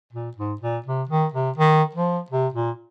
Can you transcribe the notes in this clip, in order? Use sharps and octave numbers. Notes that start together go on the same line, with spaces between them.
A#2
G#2
A#2
C3
D#3
C3
D#3
F3
C3
A#2